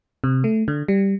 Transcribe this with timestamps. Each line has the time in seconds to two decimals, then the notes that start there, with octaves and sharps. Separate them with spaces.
0.24 C3
0.44 A3
0.68 D3
0.88 G3